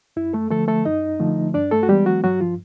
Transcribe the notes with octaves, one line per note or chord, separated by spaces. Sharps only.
F#2 E4
A3 A4
D3 F3 A3 A4
A3 A4
F#2 D#4 D#5
D3 F3 A3
G2 D4 D5
A3 A4
F#4
E3 G3 G#3 B3 G4
F#3 F#4
G2 F#3 F#4
F3 F4